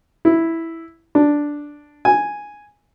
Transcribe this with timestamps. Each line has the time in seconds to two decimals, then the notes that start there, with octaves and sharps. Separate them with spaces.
0.25 E4
1.15 D4
2.05 G#5